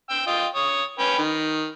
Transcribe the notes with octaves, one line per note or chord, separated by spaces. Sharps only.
G5 E6
F4 D#5 G5
C#5 D#6
C#4 B4 G5
D#3